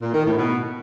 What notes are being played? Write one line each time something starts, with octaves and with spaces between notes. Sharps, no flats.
A#2
D#3
A2
B2